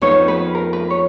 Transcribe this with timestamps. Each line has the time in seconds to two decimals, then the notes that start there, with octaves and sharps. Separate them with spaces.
0.02 F2 F3 B3 D#4 C#5
0.28 B4
0.55 A#4
0.73 B4
0.90 C#5